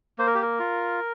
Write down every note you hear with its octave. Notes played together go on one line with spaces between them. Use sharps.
A#3 C5
A#4
G4
A#4
F4